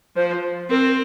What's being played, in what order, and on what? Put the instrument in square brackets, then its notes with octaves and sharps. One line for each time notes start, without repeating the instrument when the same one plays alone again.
[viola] F3 [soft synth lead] C5
[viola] C4 [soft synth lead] A#4